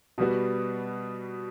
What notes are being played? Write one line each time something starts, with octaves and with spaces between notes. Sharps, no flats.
B2 G3 B3 F#4